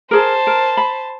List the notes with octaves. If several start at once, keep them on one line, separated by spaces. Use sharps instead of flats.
G#4 A#4 C5 A5
A#4
B5